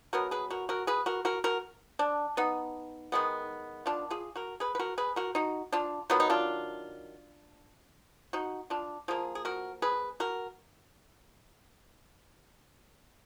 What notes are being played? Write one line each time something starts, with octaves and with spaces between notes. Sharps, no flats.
B2 F#3 B3 F#4 A#4
G#4 B4
F#4 A#4
F#4 A#4
G#4 B4
F#4 A#4
F#4 A#4
F#4 A#4
D4
B3 D#4
D#3 G#3 B3
D4 F4
F4 G#4
F#4 A#4
G#4 B4
B4
F#4 A#4
G#4 B4
F#4 A#4
D#4 F#4
D4 F4
D#3 F#3 B3 F4
D#4
D4 F4
D#4 F#4
D4 F4
F3 A#3 F4 G#4
G#4
F#4 A#4
G#4 B4
F#4 A#4